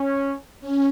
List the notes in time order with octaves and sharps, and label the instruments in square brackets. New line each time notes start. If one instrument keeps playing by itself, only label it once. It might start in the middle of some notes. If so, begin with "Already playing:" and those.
Already playing: [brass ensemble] C#4
[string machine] C#4